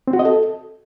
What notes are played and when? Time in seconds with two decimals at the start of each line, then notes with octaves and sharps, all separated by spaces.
0.08 C4
0.13 F#4
0.19 D#5
0.25 A4